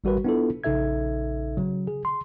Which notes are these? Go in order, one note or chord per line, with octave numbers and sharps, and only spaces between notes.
G#1 G3 F#4 A#4 B4
B3 D4 E4 F4 A4
A#1 C#3 D#4 A4 E5 G#6
C#3 F#3
G#4
C6